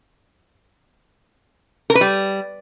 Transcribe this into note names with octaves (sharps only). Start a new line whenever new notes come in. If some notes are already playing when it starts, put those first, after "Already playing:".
A#4
B4
G3